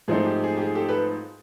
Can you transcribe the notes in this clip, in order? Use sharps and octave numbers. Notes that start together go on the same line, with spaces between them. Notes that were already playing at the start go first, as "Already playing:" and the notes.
G#2 F3 A3 C4 D#4 G#4
G4
G#4
G4
G#4
G4 A4
A4 B4